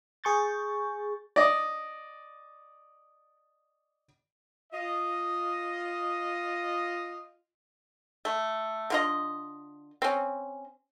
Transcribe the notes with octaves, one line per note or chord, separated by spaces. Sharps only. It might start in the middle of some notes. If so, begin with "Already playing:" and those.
G#4 C#6 G6 A6
D5 D#5
F4 D#5
A3
D3 F4 D#5
C4 C#4